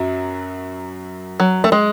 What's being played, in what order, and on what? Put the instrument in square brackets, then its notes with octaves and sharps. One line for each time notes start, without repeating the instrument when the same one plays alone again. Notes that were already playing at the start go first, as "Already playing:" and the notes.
Already playing: [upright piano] F#2 F#3
[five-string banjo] F#3
A3
G#3